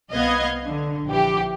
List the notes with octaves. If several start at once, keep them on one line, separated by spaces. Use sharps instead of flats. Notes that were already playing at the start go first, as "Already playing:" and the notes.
C2 B3 D#5 F5 G#6
D3
A#1 E3 G4